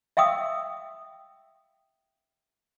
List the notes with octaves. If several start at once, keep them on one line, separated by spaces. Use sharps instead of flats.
E5 F5 G5 D#6 E6